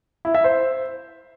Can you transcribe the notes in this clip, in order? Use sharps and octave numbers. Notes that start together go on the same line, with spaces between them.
E4
E5
C5